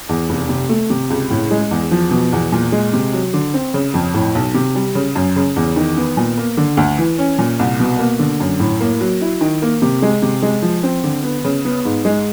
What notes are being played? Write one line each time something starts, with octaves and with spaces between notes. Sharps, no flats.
E2
F1
C3
A3
C3
C#2
A2
G#3
E2
F3
B2
E2
A#2
G#3
C3
F#3
D3
C4
C#3
F2
A2
B1
C3
G3
C#3
F#2
C#3
E2
D#3
B3
A#2
A#3
D3
D2
E3
C#4
A#2
C2
B2
A#3
D3
F#2
A2
A#3
F#3
E4
D#3
A#3
C3
G#3
C3
G#3
F3
C4
D3
B3
C#3
B3
G#2
G#3